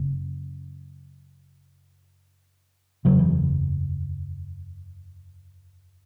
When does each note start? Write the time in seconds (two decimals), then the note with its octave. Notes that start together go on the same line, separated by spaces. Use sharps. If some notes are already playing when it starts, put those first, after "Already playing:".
Already playing: F#1 F#2 C#3
3.05 F#1 E2 C#3 F#3
3.19 E3